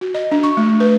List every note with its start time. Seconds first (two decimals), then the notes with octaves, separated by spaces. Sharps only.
0.01 F#4
0.14 D#5
0.31 D4
0.43 C#6
0.57 A3
0.80 B4